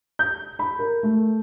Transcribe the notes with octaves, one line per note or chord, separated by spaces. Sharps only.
G6
B5
A#4
A3